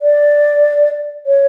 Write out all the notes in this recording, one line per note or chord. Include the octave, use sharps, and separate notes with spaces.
D5
C#5